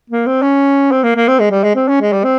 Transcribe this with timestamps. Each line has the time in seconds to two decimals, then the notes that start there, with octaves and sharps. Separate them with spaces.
0.10 A#3
0.27 C4
0.42 C#4
0.92 C4
1.03 A#3
1.16 A#3
1.28 C4
1.39 G#3
1.51 G3
1.63 G#3
1.75 C4
1.88 C#4
2.01 G#3
2.13 G3
2.24 C4